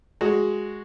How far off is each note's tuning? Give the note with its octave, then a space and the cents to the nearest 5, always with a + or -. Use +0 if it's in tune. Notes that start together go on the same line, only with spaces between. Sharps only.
G#3 +0 F#4 +0